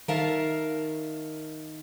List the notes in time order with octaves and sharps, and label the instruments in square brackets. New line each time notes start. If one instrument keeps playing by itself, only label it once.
[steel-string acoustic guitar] D#3 A#4 E5 F5 A5